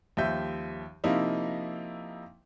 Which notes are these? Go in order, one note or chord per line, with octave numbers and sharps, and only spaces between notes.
D#2 F3 G3 E5 G6
C3 F3 A#3 D#4 E4